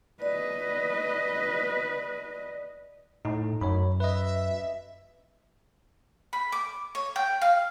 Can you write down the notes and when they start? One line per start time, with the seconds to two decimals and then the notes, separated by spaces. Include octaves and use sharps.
0.22 B4 D5 D#5
3.25 A2 D#4
3.61 F#2 C#5 B5
4.00 B4 D#5 E5
6.33 B5
6.52 D6
6.95 C#5
7.16 G5
7.41 F5